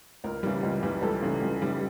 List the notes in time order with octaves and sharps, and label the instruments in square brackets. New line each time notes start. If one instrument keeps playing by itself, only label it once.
[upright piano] C#2 A#4
C#3 E3 G3
C#2
C#3 E3 G3
C#2 A4
C#3 E3 G3
C#2
C#3 E3 G3